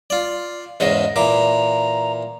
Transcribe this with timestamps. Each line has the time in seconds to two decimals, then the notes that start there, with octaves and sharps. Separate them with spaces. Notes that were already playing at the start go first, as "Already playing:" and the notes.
0.10 F4 D5
0.80 E2 G#2 C#3 D#5
1.16 A#2 E3 A#5 D6